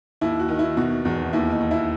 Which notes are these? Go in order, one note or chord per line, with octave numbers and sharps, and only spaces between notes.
D#2 E4
F#4
D#3
E4
B2 F#4
E2
D#2 E4
D#4
D#2
E4